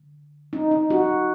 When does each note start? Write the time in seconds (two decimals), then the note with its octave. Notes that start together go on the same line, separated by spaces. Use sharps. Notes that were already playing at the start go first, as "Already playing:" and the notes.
Already playing: D3
0.53 D#4
0.71 D#4
0.90 F#4